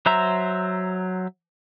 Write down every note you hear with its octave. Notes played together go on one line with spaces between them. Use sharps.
F#3 C5 E5 A#5